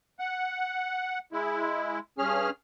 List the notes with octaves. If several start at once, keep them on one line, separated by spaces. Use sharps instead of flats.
F#5
G#3 E4
G2 C#4 G#4 F6